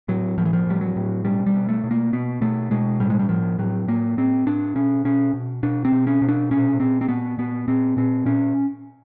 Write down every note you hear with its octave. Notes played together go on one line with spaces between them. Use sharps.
A2 F#3
A2 F3
E3
F3
A2 G3
F#3
A2
B2 G3
G3
B2
A3
B2
A#3
B2 B3
B2 A3
B2 G#3
A2 G3
G#3
G3
A2 F3
A2 F#3
A2 A#3
A2 C4
A2 D4
B2 C#4
B2 C#4
B2
B2 D4
C4
B2
C#4
B2
D4
A#2 C#4
A#2 C4
C4
A#2 B3
A#2 B3
A#2 C4
A#2 C4
A#2 C#4